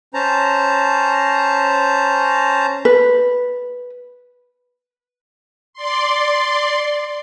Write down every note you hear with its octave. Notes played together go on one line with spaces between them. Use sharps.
C#4 C5 A5 A#5
B4
D5 C6